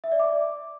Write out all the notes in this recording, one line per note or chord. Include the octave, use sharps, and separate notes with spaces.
E5
D5
D6